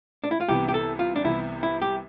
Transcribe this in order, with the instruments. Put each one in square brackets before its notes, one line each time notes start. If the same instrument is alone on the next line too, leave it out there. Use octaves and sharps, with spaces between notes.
[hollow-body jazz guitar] D4
E4
F4
[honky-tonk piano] C2 C3 E3 B3 [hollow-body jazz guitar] G4
[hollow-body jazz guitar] G4
A4
F4
D4
[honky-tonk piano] C2 C3 E3 B3 [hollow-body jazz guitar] E4
[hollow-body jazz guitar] E4
G4